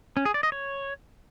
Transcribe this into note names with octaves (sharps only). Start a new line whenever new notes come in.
C#4
G#4
D5
D#5
C#5